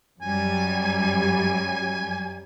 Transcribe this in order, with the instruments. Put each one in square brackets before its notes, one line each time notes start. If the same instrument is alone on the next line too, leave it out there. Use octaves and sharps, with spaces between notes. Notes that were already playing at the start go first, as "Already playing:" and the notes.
[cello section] F#2 F#3 G3 [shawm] G#5